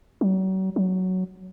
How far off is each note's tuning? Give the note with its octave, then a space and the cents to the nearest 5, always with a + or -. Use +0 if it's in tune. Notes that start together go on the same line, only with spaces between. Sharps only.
F#3 +40
F#3 +5